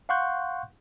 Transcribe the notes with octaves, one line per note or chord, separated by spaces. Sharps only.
F5 F#5 C6 C#6 F#6 G6